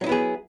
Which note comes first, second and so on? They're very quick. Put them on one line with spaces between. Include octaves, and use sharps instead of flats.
F#3 D#4 E4 B3 G#4